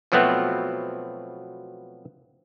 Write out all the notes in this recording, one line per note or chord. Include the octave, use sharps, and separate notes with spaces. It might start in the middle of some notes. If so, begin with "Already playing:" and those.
B2 F3 F#3 A3 B3 C4